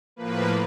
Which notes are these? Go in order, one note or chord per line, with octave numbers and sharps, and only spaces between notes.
A2 F3 A#3 B4